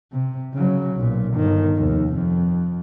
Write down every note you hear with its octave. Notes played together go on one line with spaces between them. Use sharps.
C3
C#3 F#3
B1 A#2
G1 D#3
F1 D#2
F2